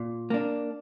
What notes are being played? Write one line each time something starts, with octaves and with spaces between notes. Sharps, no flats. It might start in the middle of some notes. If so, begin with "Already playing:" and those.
Already playing: A#2
A#3 D4